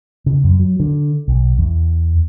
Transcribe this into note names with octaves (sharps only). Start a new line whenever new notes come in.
C#3
F#2
F#3
D3
B1
E2